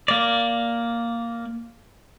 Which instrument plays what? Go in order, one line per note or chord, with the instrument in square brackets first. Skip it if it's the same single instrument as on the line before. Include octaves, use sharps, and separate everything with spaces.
[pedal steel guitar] A#3 D5